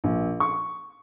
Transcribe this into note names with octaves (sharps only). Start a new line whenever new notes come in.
A#1
C#6